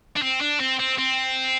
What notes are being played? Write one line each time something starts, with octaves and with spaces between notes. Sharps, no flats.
D4
C4
D4
C4
C4
C4